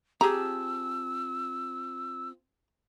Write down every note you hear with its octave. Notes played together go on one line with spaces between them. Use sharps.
C4 F4 G4 G#4 A5 A#5 E6